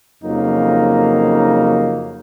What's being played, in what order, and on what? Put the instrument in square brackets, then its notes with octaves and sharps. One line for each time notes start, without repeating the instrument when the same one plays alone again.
[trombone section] F2 C#3 F#3 A#3 D#4